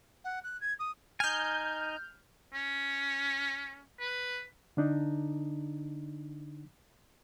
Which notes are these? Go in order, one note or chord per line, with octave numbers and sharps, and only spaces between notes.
F#5
F#6
G#6
D#6
D#4 G#5 F6 G6
C#4
B4
D3 D4 D#4